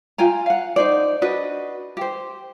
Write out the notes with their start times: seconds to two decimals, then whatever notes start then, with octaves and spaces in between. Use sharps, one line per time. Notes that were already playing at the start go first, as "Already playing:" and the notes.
0.18 F4 G5 G#5 A#5
0.46 F5 F#5
0.76 D#4 C5 D5
1.22 D4 F#4 B4 D#5
1.97 G4 C5